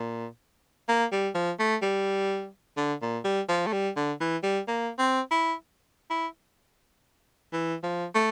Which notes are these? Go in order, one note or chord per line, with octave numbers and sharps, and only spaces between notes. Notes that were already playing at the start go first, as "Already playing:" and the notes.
Already playing: A#2
A#3
G3
F3
A3
G3
D3
A#2
G3
F3
A3
G3
D3
E3
G3
A#3
C4
E4
E4
E3
F3
A3